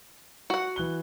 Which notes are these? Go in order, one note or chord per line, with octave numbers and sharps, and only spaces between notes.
F#4 F#5
E3 F#6 G7